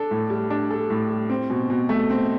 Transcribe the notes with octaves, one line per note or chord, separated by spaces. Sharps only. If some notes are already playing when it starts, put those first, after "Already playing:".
Already playing: D4 A4
A2
G3
D4
A4
A2
G3
C4
B2
B2
A3
C4